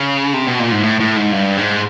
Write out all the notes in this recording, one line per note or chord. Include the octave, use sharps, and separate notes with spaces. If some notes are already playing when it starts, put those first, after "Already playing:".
Already playing: C#3
C3
B2
A#2
G#2
A2
A2
G#2
G2
G#2